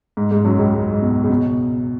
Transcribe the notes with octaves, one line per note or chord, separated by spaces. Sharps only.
G#2 G#3
G#2 G#3
F#2 F#3
C#2 C#3
G#2
G#2
B2
C#3
B2